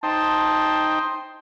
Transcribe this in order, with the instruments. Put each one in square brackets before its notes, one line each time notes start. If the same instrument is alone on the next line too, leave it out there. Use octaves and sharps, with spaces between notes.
[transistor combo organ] D#4 C5 G5 [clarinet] A5